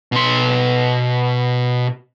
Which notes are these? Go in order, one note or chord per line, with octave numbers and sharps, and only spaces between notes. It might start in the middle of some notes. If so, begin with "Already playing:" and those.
B2 C6